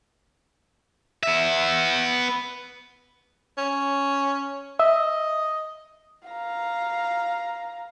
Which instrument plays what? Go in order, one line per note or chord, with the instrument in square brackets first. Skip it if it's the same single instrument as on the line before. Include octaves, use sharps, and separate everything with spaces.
[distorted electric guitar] B3 E5
[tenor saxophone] C#4
[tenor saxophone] D#5 [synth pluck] E5
[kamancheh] F5 A#5